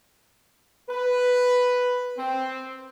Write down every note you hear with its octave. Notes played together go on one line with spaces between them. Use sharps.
B4
C4